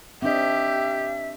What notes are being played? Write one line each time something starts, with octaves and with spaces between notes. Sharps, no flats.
C4 D4 G4 D#5 E5